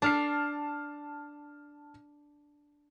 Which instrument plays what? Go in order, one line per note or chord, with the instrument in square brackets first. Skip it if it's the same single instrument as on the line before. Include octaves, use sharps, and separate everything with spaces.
[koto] D4 [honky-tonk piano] A5 F6 C7